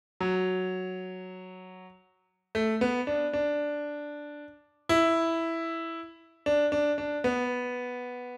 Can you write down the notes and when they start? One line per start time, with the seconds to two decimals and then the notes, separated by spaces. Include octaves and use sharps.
0.20 F#3
2.55 A3
2.81 B3
3.07 D4
3.33 D4
4.89 E4
6.46 D4
6.72 D4
6.98 D4
7.24 B3